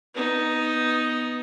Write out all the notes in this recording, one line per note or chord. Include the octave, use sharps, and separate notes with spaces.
B3 D#4